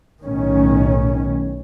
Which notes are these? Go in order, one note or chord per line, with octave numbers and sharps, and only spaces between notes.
B1 A2 D#3 C#4